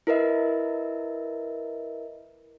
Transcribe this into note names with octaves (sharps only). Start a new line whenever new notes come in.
E4 A#4 B4 D#5 E5